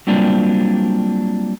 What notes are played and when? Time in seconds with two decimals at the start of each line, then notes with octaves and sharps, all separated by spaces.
0.07 F#3 G3 A#3 C4 D4 F4